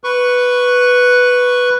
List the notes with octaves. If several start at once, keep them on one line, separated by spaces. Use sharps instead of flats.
B4 C#6